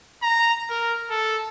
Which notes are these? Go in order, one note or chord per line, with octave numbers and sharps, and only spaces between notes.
A#5
A#4
A4